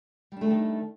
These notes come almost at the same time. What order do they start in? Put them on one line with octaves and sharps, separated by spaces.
G3 D4 A3 A4 D#3